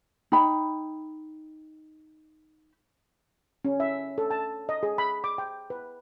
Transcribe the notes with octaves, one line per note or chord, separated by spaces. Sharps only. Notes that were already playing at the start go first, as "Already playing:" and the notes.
D#4 G5 B5
C#4
E5
A4
A5
D#5
G#4
B5
D6
G5
B4